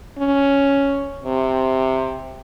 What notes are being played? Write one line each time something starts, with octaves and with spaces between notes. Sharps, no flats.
C#4
C3